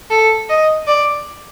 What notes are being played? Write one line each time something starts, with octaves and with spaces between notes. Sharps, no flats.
A4
D#5
D5